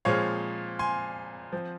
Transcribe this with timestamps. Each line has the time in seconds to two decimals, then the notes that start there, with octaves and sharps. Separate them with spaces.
0.05 A#2 F3 G#3 C4 C#5 F5
0.79 G#5 C6
1.52 F3 C4